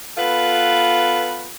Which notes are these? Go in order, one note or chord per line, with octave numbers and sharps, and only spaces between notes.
B3 F4 A4 B4